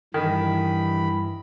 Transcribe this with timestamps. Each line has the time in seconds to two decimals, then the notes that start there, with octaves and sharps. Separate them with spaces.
0.14 G2 D#3 E3 B5